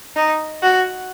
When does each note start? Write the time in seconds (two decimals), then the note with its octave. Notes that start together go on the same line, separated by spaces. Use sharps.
0.16 D#4
0.63 F#4